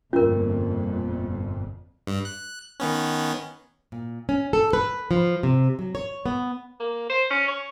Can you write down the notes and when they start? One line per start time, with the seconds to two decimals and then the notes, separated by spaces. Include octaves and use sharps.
0.13 G1 F2 A#2 C#4 F4 A#4
2.07 G2
2.25 F#6
2.80 D#3 B3 C#4
3.92 A#2
4.29 C#4
4.53 A4
4.73 B4
5.11 F3
5.43 C3
5.79 F#3
5.95 C#5
6.26 B3
6.80 A#3
7.09 C5
7.30 C#4
7.48 C#5